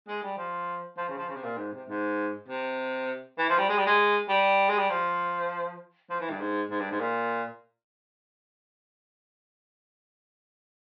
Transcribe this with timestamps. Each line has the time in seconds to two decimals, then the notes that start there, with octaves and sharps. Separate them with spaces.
0.08 G#3
0.23 G3
0.37 F3
0.97 F3
1.08 C#3
1.17 F3
1.28 C#3
1.36 C3
1.44 A#2
1.57 G#2
1.73 C3
1.88 G#2
2.48 C3
3.38 E3
3.49 F3
3.58 G3
3.69 G#3
3.78 G3
3.86 G#3
4.29 G3
4.69 G#3
4.79 G3
4.90 F3
6.10 F3
6.20 E3
6.30 G2
6.40 G#2
6.70 G#2
6.80 G2
6.91 G#2
7.01 A#2